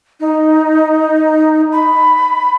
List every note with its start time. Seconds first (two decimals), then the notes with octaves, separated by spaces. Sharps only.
0.20 D#4
1.72 B5